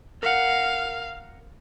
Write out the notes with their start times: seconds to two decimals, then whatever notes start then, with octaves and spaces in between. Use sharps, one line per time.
0.23 A#4 F5 F#5